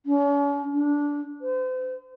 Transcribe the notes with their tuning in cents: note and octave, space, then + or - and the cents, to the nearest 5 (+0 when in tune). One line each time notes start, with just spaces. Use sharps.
C#4 +45
D4 -15
C5 -40